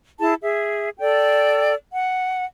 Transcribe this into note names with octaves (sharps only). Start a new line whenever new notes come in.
E4 G#4 A5
G#4 E5
A4 D5 G5
F#5